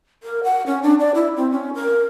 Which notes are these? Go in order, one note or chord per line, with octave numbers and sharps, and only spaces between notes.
A#4
F#5
C#4
D4
D5
E4
C4
C#4
A#4